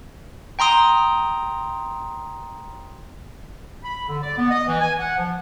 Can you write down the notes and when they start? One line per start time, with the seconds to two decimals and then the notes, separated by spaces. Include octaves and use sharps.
0.59 G5 A#5 C6 D#6
3.84 B5
4.09 D3
4.23 D5
4.38 B3
4.51 D#5
4.68 E3
4.80 G#5
4.99 F#5
5.17 F3